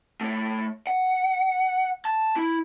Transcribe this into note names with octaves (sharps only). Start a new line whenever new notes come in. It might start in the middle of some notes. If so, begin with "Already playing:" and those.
A3 C#5
F#5
A5
E4